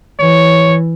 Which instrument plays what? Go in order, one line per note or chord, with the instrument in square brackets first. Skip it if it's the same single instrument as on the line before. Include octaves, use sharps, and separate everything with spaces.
[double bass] E3 [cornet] C#5